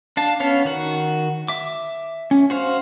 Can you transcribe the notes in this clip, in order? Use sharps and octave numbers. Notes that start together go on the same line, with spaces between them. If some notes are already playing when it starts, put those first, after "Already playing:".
D4 F5 A5
B3 C#4 C#5 F5
D#3 F#4 F#5
E5 D6
C#4
F#4 C5 F5